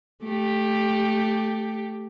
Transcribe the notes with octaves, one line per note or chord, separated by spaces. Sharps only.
A3 G4